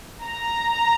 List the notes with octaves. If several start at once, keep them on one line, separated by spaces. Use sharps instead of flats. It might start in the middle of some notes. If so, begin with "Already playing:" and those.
A#5